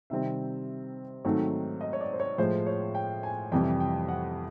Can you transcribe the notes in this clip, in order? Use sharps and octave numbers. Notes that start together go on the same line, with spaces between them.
C3 D#3 G3 C4 E5
G#2 D#3 F#3 A3 C4
D#5
C#5
D5
C5
C#5
A2 F3 G#3 C5
C#5
G5
G#5
F2 C3 E3 G3 G5
G5
F#5